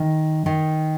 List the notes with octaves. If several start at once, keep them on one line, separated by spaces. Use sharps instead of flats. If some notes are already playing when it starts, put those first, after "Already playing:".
Already playing: D#3
D#3